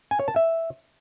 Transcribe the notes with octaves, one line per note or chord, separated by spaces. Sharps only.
G#5
C#5
A5
E5